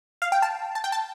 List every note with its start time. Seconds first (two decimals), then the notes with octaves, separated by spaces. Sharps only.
0.22 F5
0.32 G5
0.42 A5
0.75 A5
0.84 G5
0.92 A5